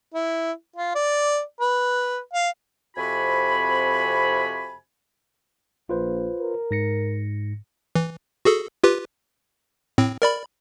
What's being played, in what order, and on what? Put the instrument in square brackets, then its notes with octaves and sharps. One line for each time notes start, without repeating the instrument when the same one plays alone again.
[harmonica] E4
F4
D5
B4
F5
[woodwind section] F2 C3 F#4 G#5 B5
[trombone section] A#1 [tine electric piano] F4 B4 C5
[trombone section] A#4
[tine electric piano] G#2 A#6 C#7
[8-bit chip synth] E3
F#4 G#4 A4
F4 G4 B4
A2 C4
A#4 D5 B5